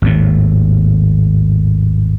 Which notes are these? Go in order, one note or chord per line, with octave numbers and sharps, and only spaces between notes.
G#1 D#2 A2